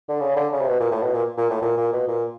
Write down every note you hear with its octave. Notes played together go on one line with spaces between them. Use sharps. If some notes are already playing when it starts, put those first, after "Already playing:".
D3
C#3
D3
C#3
C3
B2
A#2
A2
B2
A#2
A#2
A2
A#2
A#2
B2
A#2